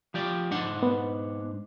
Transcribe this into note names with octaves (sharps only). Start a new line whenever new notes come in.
F3 G4 D5
G#2 D4 F#5
B3